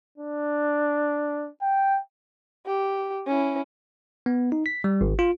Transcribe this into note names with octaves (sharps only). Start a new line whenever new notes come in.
D4
G5
G4
C#4 E4
B3
D#4
B6
G3
G#1
F4